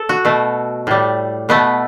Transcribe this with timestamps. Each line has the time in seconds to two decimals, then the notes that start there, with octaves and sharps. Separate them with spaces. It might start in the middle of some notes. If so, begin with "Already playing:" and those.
Already playing: A4
0.09 F#4
0.25 B2 A3
0.87 A2 G3
1.49 B2 A3 B3